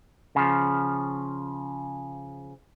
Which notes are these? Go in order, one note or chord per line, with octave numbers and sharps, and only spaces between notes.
C#3 F3